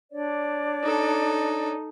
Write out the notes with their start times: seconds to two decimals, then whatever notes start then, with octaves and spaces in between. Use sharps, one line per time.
0.11 D4 C#5 D5
0.83 D#4 A4